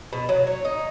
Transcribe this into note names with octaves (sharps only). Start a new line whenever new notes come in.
B2
F#3
C#5
D#4